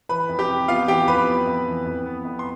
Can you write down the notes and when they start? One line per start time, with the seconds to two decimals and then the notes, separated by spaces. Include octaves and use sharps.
0.09 E3 B4 B5
0.29 F2
0.39 G4 G5
0.49 C3
0.68 B3 F4 F5
0.88 E3 G4 G5
1.08 F2 B4 B5
1.27 B3
1.47 F2
1.66 E3
1.86 F2
2.06 B3
2.25 F2
2.39 C6